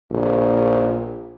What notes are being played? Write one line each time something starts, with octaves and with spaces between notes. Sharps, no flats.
A#1